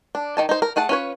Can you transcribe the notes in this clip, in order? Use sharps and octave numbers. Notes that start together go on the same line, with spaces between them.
D4
D#3 D#4 A5
D#4 C5
A#4
A3 G#4 F#5 A5
C#4 F4 B4 C#5